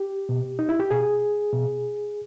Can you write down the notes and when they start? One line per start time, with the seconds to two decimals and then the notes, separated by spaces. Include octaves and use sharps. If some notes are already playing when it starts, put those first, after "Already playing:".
Already playing: G4
0.29 B2
0.59 D#4
0.69 E4
0.80 G4
0.91 B2 G#4
1.53 B2